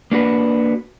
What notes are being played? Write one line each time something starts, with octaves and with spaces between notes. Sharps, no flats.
A#3 D4 F#4 B4